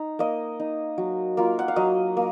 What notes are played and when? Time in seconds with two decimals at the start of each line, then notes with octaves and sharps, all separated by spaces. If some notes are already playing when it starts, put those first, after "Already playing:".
Already playing: D#4
0.19 A#3 D#5
0.60 D#4
0.98 F#3
1.37 A#3 F4
1.59 F#5
1.68 F5
1.76 F#3 D#5
2.17 A#3